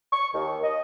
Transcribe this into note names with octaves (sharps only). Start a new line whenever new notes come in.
C#6
D#2
D#5